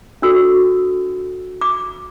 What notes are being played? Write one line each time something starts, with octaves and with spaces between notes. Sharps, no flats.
D4 F#4 A4 E6
D6